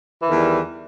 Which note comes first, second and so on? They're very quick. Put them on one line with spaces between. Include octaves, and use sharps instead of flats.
E3 D#3 E2 G3